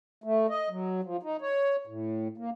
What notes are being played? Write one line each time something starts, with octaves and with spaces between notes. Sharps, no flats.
A3
D#5
F#3
F3
D#4
C#5
A2
A#3